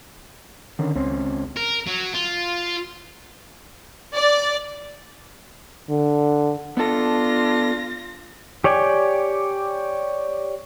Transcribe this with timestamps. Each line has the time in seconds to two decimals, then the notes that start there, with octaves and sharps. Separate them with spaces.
0.79 D3 D#3 C#4
0.95 C#2 C4 C#4
1.57 A#4
1.87 F#3
2.14 F4
4.14 D5
5.89 D3
6.77 B3 D4 F4 A4 A#6
8.64 G4 C#5 D5 G5 G#5